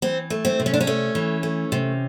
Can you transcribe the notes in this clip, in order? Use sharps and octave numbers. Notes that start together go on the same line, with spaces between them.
E3 C4
A3
C4
C3
C#4
D4
C#4
A3
E3
A3
C3